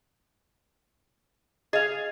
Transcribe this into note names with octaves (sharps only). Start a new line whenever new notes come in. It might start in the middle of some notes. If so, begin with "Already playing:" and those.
G#4 D#5 F5